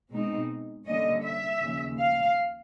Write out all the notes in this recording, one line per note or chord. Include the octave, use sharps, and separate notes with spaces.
B2 G#3 C4 D#4
D3 G3 A#3 C#4 D#5
E5
D#2 C#3 F3
F5